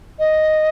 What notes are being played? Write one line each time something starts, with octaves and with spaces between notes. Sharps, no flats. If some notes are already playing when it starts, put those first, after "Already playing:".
D#5